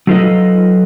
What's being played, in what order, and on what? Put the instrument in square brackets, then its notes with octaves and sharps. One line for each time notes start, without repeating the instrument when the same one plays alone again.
[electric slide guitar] F#3 D#4 F4 A4 B4 D#5